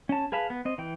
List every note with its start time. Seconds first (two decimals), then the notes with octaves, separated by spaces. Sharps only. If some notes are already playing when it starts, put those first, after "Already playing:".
0.09 C#4 A5
0.32 G#4 B4 F5 A5 B5
0.50 B3
0.65 C4 D#5
0.78 E3 G5